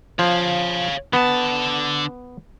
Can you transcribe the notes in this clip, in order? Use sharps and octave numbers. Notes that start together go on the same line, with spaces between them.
F3 C#5 F5
D3 B3 A5